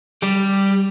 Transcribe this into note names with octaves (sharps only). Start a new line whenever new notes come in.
G3 G4